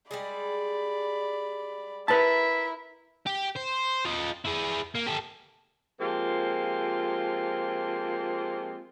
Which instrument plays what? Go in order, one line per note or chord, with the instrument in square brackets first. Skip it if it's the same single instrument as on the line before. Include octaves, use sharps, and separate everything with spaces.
[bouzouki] G3 G#3 G#4 [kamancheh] D5 B5
[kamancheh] E4 A#4 [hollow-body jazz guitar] B4 A5 [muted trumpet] E5
[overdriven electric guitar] G4
C5
F4 D#5
E4 G#4
A#3
G4 A4
[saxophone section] F3 G#3 A#3 C4 F4 G4